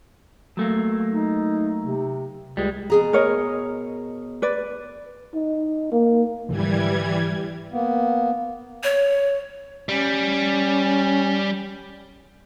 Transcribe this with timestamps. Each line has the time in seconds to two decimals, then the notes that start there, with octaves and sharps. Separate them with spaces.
0.57 F#3 A3 A#3
1.10 D#4
1.82 C3
2.57 C#2 G3 G#3
2.90 B2 G#4 A#5
3.13 A#4 C#5 D#5
4.42 B4 D5
5.34 D#4
5.92 A#3
6.49 G#2 D3 E3 F3 G3 G#6
7.72 A#3 B3
8.83 C#5
9.89 G3 C#4